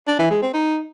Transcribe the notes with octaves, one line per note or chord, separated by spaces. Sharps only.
D4
E3
G#3
C4
D#4